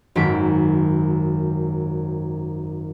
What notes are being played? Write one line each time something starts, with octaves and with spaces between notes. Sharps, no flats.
G#1 F#2 D#3 A4 B6 D7